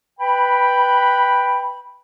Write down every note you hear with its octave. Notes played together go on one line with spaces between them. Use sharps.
B4 G5 B5